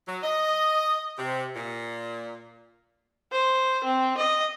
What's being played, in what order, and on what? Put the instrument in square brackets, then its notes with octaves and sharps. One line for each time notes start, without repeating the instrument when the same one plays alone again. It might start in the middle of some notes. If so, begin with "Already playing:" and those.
[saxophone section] F#3
D#5
C3
A#2
[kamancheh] C5
C4
D#5